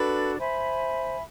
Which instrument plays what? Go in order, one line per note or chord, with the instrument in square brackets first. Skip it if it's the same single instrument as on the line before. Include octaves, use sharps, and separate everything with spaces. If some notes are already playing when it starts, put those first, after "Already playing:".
Already playing: [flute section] D4 F#4 A4 [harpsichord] B4
[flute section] C5 E5 G#5 B5